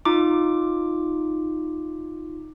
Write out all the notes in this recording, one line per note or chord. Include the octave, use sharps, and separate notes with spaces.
D#4 F4 D6